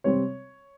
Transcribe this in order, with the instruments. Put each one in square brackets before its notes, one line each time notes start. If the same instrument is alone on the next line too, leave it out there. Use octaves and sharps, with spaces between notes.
[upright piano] C3 G3 C4 C#5